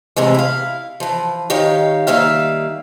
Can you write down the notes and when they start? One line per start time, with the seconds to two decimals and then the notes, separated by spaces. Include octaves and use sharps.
0.17 A2 C3 E3 G#3
0.34 E4 F5
1.00 E3 F3
1.50 D#3 D#4 G4 C#5 F5
2.07 D#3 G3 A#3 E5 F5